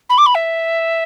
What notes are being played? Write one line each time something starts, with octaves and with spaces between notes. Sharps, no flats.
B5
D6
B5
E5